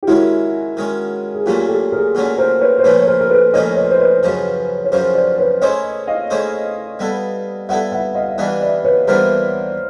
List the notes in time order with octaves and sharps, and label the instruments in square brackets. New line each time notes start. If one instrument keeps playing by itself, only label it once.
[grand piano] G4
[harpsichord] D#3 G#3 C#4 [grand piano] E4 F#4
[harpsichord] D#3 G#3 C#4
[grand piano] G#4
[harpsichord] A#2 F#3 A3 C#4 [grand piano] F4 G4
[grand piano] G4 A4
G#4 A#4
[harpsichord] A#2 F#3 A3 C#4
[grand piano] A#4 C5
B4 C#5
C5
[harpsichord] A#2 F3 A3 C#4 [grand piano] B4 C#5
[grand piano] C#5
A#4 C5
A#4
A4 B4
[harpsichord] A#2 F3 A3 C#4 [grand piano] C#5 D#5
[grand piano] C#5 D#5
C5
B4 C#5
[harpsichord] F#2 C#3 F3
[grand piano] C#5
[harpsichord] F#2 C#3 F3 [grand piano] A#4 C5
[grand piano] C5 D5
B4 C#5
[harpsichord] A3 C#4 E4 G#4 C5 [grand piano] C#5 D#5
[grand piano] D#5 F5
[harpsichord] A3 C#4 E4 G#4 C5
G3 B3 E4 A4
[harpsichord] G3 B3 E4 A4 [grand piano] E5 F#5
[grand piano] E5 F#5
D#5 F5
E5
[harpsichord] E3 G3 B3 D4 [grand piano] D#5 F5
[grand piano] D5 E5
B4 C#5
[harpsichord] E3 G3 B3 D4 [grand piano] A#4 C5